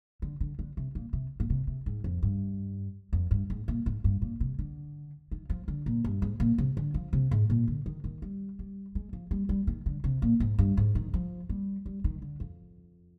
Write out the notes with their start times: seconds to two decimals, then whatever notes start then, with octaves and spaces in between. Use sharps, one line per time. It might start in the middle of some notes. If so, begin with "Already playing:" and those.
0.22 D3
0.40 D3
0.59 D3
0.77 C3
0.95 A#2
1.13 C3
1.40 A#2
1.50 C3
1.67 C3
1.86 G#2
2.04 F2
2.23 G2
3.13 F2
3.31 G2
3.50 G#2
3.68 A#2
3.86 G#2
4.04 G2
4.22 A#2
4.40 C3
4.59 D3
5.31 D#3
5.50 F3
5.68 D3
5.86 A#2
6.04 G2
6.22 G#2
6.40 A#2
6.58 C3
6.77 D3
6.94 F3
7.13 C3
7.31 G#2
7.50 A#2
7.68 D3
7.86 D#3
8.04 D#3
8.22 G3
8.59 G3
8.95 G#3
9.13 F3
9.31 G3
9.49 G3
9.67 D#3
9.86 D3
10.04 C3
10.22 A#2
10.40 G#2
10.59 G2
10.77 G#2
10.95 D#3
11.14 F3
11.49 G3
11.86 G3
12.04 D#3
12.22 D3
12.40 F2